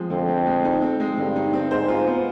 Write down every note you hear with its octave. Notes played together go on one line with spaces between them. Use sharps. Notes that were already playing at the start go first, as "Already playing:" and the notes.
Already playing: F3 G#3 C4
F2 D3
C4
G#3
D#4
C4
G#3
G2 D3
D#4
C4
G#2 C5
F4
B3